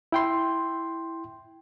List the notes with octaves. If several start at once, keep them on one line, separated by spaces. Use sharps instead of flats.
E4 G5 C6